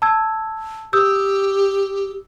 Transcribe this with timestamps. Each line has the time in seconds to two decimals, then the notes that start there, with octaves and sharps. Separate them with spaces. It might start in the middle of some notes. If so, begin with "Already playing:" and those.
0.02 A5 E6 G#6
0.93 G4 D#6 E6 G6